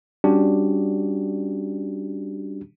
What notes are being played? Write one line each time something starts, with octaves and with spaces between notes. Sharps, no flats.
G3 C#4 D4 F#4 G4